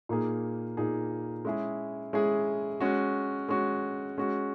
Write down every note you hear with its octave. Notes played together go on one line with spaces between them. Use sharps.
A#2 A#3 D#4 G#4
A#2 A#3 D#4 G#4
G#3 C#4 E4 G#4
G#3 C#4 E4 G#4
G#3 C#4 F#4
G#3 C#4 F#4
G#3 C#4 F#4